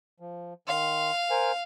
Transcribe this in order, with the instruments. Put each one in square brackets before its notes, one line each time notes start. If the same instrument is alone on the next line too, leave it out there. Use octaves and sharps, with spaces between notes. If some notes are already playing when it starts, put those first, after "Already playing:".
[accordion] F3
[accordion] D#3 C6 [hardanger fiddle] F5
[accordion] A#4 C5 G#5